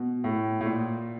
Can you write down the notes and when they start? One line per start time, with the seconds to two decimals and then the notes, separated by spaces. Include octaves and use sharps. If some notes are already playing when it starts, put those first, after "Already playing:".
Already playing: B2
0.24 A2
0.61 A2
0.66 A#2